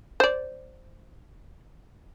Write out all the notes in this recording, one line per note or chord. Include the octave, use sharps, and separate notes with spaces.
C5 D5